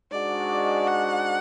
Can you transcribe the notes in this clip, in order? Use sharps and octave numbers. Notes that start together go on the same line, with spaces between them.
G#2 G#3 D4 F#4 D5
F#5